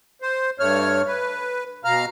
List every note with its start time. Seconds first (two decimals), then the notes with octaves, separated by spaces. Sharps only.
0.22 C5
0.59 G2 A3 C#5 F6
1.07 B4
1.85 B2 F5 A#5 F6